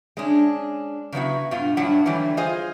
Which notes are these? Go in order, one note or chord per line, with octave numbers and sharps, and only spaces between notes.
G#3 C#4 D4
C#3 F#3 B3 E4 F#4
G2 B2 F4
G2 F#3 G3 D4 E4 F#5
D3 E3 F#3 G3 A3
F4 G#4 C5 D#5